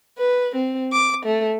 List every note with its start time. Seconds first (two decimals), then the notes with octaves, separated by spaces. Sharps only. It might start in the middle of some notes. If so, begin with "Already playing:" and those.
0.18 B4
0.55 C4
0.93 D6
1.26 A3